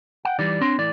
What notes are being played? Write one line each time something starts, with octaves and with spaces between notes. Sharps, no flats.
F#5 G5
E3 G3 D#4 D5
C4 D4 C#5 C6
A2 E3 D5